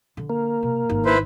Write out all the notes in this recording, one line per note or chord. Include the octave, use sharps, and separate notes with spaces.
D3
A#3
C3
G#1 D#4
E4 B4 C5